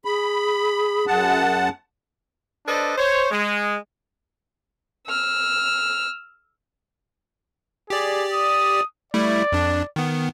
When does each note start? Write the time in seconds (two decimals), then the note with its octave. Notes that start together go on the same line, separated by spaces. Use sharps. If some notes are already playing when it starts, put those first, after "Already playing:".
0.05 G#4 B5
1.07 F#2 F#5 A5
2.67 D4 A4 B4 C5 D5 D#5
2.98 C5 C#5
3.31 G#3
5.07 E6 F6
7.90 G4 G#4 D5
8.33 D#6
9.14 G3 A3 E4 D5
9.52 F2 D4
9.96 D#3 B3